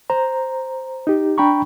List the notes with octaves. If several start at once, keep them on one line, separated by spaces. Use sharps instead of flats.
C5 A#5
D#4 G4
D4 G5 A#5 B5 C#6